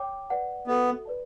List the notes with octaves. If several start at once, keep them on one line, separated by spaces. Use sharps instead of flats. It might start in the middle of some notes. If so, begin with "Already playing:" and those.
Already playing: C#5 G5 D6
B4 D5 F#5 A5
B3 F#4 A4 E5
B4 D5 A5